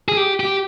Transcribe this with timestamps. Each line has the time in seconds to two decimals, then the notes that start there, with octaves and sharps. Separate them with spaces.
0.09 G#4
0.17 G4
0.40 G4